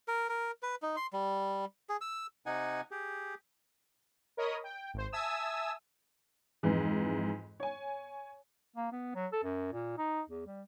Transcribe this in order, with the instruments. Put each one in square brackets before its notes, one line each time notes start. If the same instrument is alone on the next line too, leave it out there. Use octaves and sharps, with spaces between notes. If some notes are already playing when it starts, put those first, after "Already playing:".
[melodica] A#4
A#4
B4
D#4
C6
G3
G#4
E6
[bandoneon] C3 D#4 F#5 G#5
G4 G#4
[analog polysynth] A#4 C#5 D#5 B5 D#6
G5
G#1 C5
E5 G#5 A5 D#6 E6
[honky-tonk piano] F2 G#2 E3
C#5 G#5
[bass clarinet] A#3
B3
F#3
A4
F#2
A#2
D#4
E2
G3